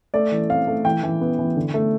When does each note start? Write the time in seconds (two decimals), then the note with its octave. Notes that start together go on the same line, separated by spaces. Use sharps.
0.14 A3 D5
0.32 E3
0.49 C4 F5
0.67 A3
0.85 E3 G5
1.03 E3
1.21 B3
1.39 E3
1.56 D3
1.74 A3